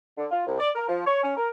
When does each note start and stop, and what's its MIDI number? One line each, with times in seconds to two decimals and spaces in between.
0.17 0.26 50
0.31 0.46 65
0.47 0.59 36
0.59 0.69 74
0.75 0.84 70
0.88 1.05 53
1.06 1.23 73
1.24 1.37 61
1.37 1.50 70